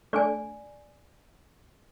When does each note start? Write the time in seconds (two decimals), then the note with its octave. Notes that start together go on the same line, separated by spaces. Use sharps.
0.13 A3 D4 D5 G#5